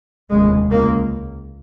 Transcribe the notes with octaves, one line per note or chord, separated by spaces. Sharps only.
F1 D#2 C#3 G#3
C#2 C#3 A#3